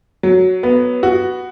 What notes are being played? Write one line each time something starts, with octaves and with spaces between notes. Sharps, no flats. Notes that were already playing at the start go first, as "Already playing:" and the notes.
F#3
B3
F#4